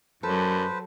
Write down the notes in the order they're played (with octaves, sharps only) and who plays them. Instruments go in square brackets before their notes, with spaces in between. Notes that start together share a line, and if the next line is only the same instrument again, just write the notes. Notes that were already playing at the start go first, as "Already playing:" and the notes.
[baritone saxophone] F#2 [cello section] F#3 [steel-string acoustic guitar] A4 [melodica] B4 C5